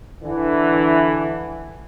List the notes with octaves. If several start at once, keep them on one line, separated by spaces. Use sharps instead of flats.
D3 E3